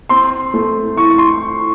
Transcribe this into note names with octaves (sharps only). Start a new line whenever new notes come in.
C4 C6
A3
E3 C#6
C6